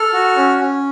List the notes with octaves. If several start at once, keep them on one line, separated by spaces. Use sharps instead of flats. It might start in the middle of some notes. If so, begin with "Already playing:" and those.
Already playing: A4 F6
F#4
C#4
C#4